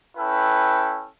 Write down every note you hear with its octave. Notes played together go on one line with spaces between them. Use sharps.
C#4 E4 A4 B4 G5